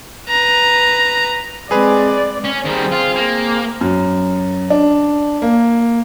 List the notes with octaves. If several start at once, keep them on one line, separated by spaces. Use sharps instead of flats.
B4 A#5
G#3 C4 G#4 B4 D5
C#4
D#3 G3 C4 G#4 C5
F4
A#3
F#2
D4
A#3